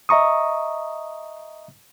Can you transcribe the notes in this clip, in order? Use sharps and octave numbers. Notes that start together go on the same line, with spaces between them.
D#5 E5 A#5 C#6 D#6